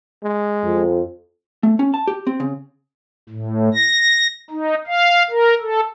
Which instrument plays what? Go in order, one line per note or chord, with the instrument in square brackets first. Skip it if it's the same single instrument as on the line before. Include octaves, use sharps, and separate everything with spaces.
[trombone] G#3
[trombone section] F2
[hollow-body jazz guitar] A3
C#4
A5
G4
C4
C#3
[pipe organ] A2
A#6
D#4
F5
A#4
A4